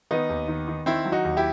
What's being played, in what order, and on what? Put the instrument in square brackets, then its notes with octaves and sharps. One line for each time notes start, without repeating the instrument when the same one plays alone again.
[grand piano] D#3 B3 D#4
D#2
D#3
D#3
D#3 C4 E4
F#3
D#4 F#4
D#2
E4 G4